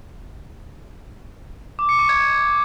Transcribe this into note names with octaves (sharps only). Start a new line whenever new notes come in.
D6
C#7
C#6
G#6